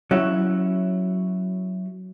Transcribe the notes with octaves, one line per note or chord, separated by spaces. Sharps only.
F#3 C#4 E4